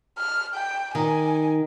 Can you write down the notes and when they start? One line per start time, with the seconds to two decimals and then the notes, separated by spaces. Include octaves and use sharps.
0.18 F6
0.55 G5
0.95 D#3 G#5